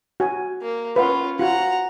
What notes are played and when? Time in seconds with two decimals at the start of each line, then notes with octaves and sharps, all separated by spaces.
0.20 F#4 G#5
0.62 A#3
0.96 C#4 F4 B4 F5 F#5
1.39 F4 F#4 F#5 A#5